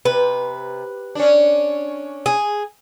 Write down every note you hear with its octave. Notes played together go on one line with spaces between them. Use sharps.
C3 B4
C#4 D4
G#4